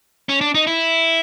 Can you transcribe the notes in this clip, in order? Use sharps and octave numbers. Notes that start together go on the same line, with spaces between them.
C#4
D4
D#4
E4